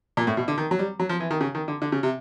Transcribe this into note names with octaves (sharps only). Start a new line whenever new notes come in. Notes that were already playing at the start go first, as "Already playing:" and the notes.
A#2
A2
B2
D3
D#3
F#3
G3
F#3
F3
E3
D#3
C#3
D#3
D3
D3
C#3
C3